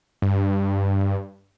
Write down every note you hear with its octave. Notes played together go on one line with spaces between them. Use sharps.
G2